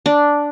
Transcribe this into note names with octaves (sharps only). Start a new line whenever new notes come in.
D4